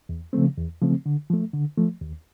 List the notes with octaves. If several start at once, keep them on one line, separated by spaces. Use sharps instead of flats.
E2
C#3 F3 A3 C4
E2
C#3 F3 A3 C4
D3
F3 A3
D3
F3 A3
D#2